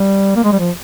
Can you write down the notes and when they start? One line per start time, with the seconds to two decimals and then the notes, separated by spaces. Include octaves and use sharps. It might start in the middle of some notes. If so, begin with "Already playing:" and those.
Already playing: G3
0.36 A#3
0.44 G#3
0.52 G3
0.59 F3